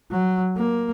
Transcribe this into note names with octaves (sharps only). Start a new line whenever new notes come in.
F#3
A#3